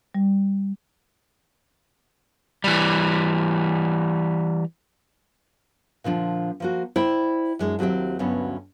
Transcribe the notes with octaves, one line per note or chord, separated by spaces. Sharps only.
G3
E3 G3
A#2 D3 F3 D4
F3 A#3 F#4
E4 C5 D5 G5
F#2 G#3 D4
D#2 F#3 C4 G4 E5
D2 G2 D3 F#3 B3 C#4